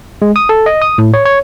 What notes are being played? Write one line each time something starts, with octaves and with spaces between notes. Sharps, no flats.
G#3
D#6
A4
D#5
D#6
A2
C#5
C#5